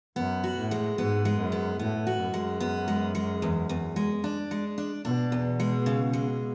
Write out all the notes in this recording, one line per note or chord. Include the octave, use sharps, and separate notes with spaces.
F#2 B3
F#4
A2
G#3
G#2 B3
G#3
F#2
B3
A2 B3
F#4
F#2
G#3
B3
G#3
G#3
E2
E2
G#3
D4
G#3
D4
B2 D4
E2
G#3
C#3
G#3